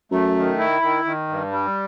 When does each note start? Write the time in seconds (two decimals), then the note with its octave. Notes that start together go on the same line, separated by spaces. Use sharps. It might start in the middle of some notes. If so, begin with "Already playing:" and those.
0.11 F#2 A3
0.36 D#3
0.58 E4
0.82 D#3
1.05 D#3
1.28 G2
1.52 G3